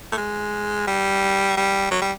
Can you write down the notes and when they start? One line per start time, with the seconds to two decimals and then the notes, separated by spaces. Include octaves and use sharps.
0.12 A3
0.18 G#3
0.87 G3
1.57 G3
1.91 F#3
2.02 G3